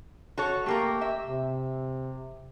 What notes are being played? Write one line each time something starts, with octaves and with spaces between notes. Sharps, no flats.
F#4 A4 C#5
A3 A#3 G4 A#4
E5
C3